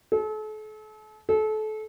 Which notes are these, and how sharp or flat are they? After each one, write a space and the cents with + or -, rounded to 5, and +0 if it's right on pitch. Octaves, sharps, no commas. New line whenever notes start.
A4 -40
A4 -30